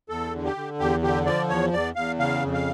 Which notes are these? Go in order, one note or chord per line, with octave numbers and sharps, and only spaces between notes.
E2 A4
D3
G4
D3
E2 G4
D3 G4
F3 D5
E2 C#5
E2 D5
E2 F5
C#3 F5
F2
F5